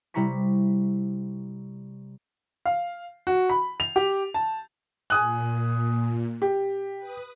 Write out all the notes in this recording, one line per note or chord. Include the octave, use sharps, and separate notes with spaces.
C3 G3 E4 A#5 C#6 B6
F5
F#4
B5
F7
G4
A5
A#2 G#5 D#6 F#6
G4
B4 D#6